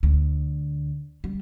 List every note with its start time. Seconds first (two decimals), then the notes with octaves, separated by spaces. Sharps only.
0.03 D2
1.24 G3